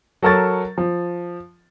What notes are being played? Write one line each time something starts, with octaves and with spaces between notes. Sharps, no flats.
F#3 A4 A#4 C#6 A6
F3